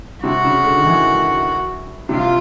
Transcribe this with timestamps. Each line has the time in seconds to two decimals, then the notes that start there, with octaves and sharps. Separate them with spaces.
0.23 C3 F#4
0.44 C#3
0.64 D3
0.78 D#3
0.85 E3
2.09 C3 F4